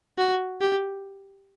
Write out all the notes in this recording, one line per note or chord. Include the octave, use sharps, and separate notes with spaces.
F#4
G4